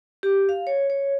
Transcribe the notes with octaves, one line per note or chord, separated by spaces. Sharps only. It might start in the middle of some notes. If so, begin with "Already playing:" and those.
G4
F5
C#5
C#5